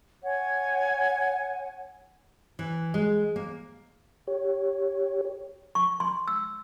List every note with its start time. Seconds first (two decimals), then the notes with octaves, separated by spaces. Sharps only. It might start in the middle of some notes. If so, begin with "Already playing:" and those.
0.25 C#5 F#5 G#5
2.59 E3
2.94 G#3
3.36 A#3
4.27 G4 C#5
5.75 C#6
6.00 C6
6.28 E6